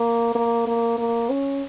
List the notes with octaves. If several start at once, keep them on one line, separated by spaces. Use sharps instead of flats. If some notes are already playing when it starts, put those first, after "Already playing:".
Already playing: A#3
A#3
A#3
A#3
C#4